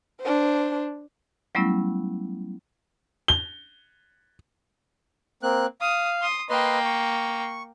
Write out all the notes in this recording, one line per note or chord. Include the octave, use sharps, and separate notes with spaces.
D4 C5
F#3 G3 A3 B3 C#4 E4
G7
A#3 C4 F#6
F5 D#6
C6 D#6
A#3 B4 D#5 G5 C6
C#6